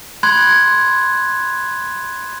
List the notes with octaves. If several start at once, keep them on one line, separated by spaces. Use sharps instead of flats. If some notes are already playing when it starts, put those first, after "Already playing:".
B5 C6 F#6 G#6